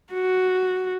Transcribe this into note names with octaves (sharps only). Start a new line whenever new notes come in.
F#4